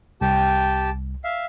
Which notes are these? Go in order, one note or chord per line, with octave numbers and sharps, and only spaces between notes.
C2 G4 G5 A5
E5 F5